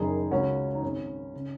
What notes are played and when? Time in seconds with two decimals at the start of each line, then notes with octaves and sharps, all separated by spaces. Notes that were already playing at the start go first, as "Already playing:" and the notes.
Already playing: F#1 F#2 D#3 D#4 G#4
0.31 C#2 C#3 C#4 F#4
0.75 D#4
0.82 G#1 G#2 D#3 C#4
1.34 C#3